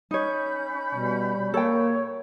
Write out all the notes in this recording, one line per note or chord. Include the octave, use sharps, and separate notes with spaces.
C#4 D#4 C#5 B5 G6
B2 G3
A#3 A4 C#5 G5